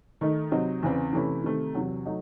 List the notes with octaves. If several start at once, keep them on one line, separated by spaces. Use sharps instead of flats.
D#3 A3 D#4
C3 F#3 C4 D#4
E2 C#3 E3 C4
C3 E3 A3 C#4 E4
C3 D#3 A3 C4
E2 C3 F#3
F#3 A3 D#4